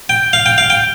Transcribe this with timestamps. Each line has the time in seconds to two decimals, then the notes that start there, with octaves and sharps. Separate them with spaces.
0.09 G5
0.33 F5
0.46 G5
0.58 F5
0.70 G5